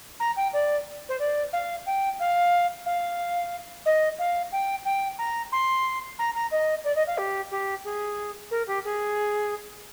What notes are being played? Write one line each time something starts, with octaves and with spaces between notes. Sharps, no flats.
A#5
G5
D5
C5
D5
F5
G5
F5
F5
D#5
F5
G5
G5
A#5
C6
A#5
A#5
D#5
D5
D#5
F5
G4
G4
G#4
A#4
G4
G#4